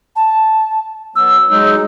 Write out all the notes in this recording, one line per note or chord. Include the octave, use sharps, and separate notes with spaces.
A5
F#3 B3 E6
F#3 G#3 D#4